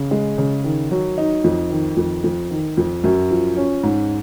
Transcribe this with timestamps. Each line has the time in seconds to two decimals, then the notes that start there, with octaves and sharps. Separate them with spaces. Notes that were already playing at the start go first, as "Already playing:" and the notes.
Already playing: C#3
0.11 G#3
0.38 C#3
0.64 D#3
0.91 F#3
1.18 D#4
1.44 F2
1.70 D#3
1.97 F2
2.24 F2
2.51 D#3
2.77 F2
3.04 F#2
3.31 F3
3.57 C#4
3.83 G#2